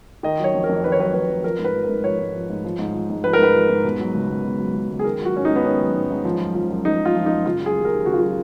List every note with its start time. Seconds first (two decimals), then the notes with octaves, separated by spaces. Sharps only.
0.23 D#3 D#5
0.39 F#3 C#5
0.55 F2
0.64 A#4
0.69 F2
0.84 D#3 B4
0.92 C#5
0.99 F#3 B4
1.14 F2 B4
1.29 F2
1.44 F3 A#4
1.59 G#2
1.64 B4
1.75 F3
1.84 G#2 A#4
2.04 F3 C#5
2.19 G#2
2.35 F3
2.50 G#2
2.65 F3
2.79 G#2
2.94 F3
3.10 G#2
3.24 F3 B4
3.33 A#4
3.39 G#2 B4
3.55 F3
3.69 G#2
3.84 B2
4.00 F#3
4.14 C#2
4.30 C#2
4.45 B2
4.59 F#3
4.74 C#2
4.90 C#2
4.99 G#4
5.04 D#3 A#4
5.20 F#3 F#4
5.35 G#2 C#4
5.45 D#4
5.51 G#2
5.56 B3
5.65 D#3 C#4
5.81 F#3
5.96 G#2
6.11 G#2
6.25 F3
6.41 F#2
6.55 F3
6.70 F#2
6.85 F3 D#4
7.00 F#2
7.05 F4
7.16 F3
7.26 F#2 D#4
7.46 C#3 F4
7.60 F#3
7.66 G#4
7.75 D#2
7.85 A#4
7.90 D#2
8.05 C#3 F#4
8.13 F4
8.20 F#3 F#4